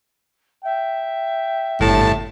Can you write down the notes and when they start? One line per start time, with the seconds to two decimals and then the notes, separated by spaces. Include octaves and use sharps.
0.64 E5 G5
1.80 G1 A2 A5